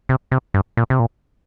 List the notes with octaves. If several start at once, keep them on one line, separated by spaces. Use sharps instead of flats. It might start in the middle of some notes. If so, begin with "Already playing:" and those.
C3
C3
G2
A#2
C3
A#2